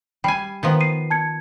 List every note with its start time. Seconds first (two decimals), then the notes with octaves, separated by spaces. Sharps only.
0.24 G3 G5 G#5 B5 C7
0.63 D#3 F3 B3
0.81 C7 D#7
1.10 A5 G#6 C#7